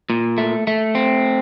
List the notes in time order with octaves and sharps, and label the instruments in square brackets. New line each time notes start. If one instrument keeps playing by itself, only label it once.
[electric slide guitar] A#2
A3
A3
C4